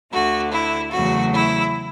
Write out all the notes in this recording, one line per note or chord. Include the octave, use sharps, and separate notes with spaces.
D2 D3 A3 F#4
E4
E2 C#3 F#3 A3 F#4
E4